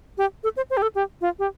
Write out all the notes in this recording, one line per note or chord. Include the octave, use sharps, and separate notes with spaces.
G4
A4
C5
C5
G4
A4
G4
F4
G4